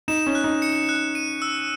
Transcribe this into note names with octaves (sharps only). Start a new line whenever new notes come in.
D#4 E7
C#4
F#6
D#4
C#7
F#6
D#7
E6